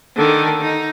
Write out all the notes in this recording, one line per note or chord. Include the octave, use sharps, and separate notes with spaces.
D3 D#3
D#4